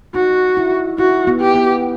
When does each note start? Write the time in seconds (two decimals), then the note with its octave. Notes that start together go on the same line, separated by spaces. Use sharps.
0.14 D#4 F#4
0.57 E4
0.98 E4 F#4
1.27 B3
1.40 G4
1.55 B3